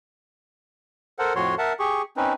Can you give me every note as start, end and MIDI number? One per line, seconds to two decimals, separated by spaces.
1.19 1.33 69
1.19 1.33 70
1.19 1.33 72
1.19 1.33 78
1.35 1.55 41
1.35 1.55 45
1.35 1.55 53
1.35 1.55 66
1.35 1.55 73
1.35 1.55 84
1.58 1.73 70
1.58 1.73 76
1.58 1.73 78
1.58 1.73 81
1.79 2.02 67
1.79 2.02 68
1.79 2.02 85
2.17 2.33 60
2.17 2.33 61
2.17 2.33 63
2.17 2.33 71